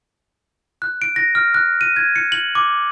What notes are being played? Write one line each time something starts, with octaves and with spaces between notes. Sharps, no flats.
F#6
D7
A#6
F6
F#6
D#7
G#6
C#7
F#7
D6